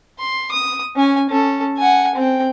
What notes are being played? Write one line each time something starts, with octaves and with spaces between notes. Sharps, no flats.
C6
D#6
C#4 G#5
C#4 A4
F#5 G#5
C4 G5